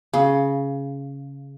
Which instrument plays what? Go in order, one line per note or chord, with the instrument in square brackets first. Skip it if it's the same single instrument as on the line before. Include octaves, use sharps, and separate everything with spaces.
[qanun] C#3